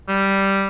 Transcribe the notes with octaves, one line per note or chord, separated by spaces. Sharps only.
G3